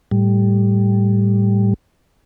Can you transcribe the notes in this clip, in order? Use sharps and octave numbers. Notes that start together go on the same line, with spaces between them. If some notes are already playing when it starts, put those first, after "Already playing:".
A2 G3